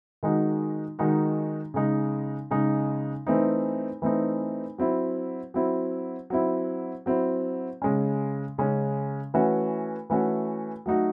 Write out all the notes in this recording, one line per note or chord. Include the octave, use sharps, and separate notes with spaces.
D#3 G#3 D#4 F#4
D#3 G#3 D#4 F#4
C#3 G#3 D#4
C#3 G#3 D#4
E3 A3 C4 D#4
E3 A3 C4 D#4
F#3 C4 E4
F#3 C4 E4
F#3 C4 E4
F#3 C4 E4
C#3 G#3 C#4
C#3 G#3 C#4
E3 A3 C#4 F#4
E3 A3 C#4 F#4
F#3 A3 D#4 F#4